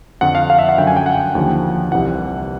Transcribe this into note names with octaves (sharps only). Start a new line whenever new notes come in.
F2 D3 F3 F#5
F5
F5
E5
F#5
F#2 D3 F#3 G5
G#5
G5
F#5
D#2 D3 F3
C2 C3 E3 F#5